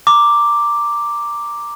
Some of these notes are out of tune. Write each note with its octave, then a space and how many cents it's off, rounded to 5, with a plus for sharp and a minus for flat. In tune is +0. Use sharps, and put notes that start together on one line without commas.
A#5 +0 D6 +0